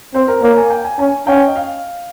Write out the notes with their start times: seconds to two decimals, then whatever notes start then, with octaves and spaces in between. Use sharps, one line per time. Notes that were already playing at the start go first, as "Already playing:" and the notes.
0.14 C4 C5
0.28 A#4
0.42 A#3 C#5
0.57 G#5
0.70 G5
0.84 G#5
0.99 C#4 G#5
1.27 C#4 G5
1.47 D#5
1.55 F5